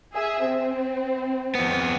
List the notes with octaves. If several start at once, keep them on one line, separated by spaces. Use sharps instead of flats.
G#4 E5
C4
F2 B3